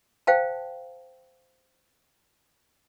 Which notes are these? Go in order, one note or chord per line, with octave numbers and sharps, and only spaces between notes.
C5 F5 G5 A5